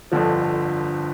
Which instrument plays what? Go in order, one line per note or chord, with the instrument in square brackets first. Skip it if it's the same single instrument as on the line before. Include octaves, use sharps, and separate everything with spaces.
[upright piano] G1 F2 D3 F3